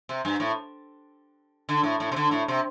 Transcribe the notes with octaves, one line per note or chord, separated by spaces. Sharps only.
C3
G2
A2
D3
A2
A2
C3
D3
A2
C3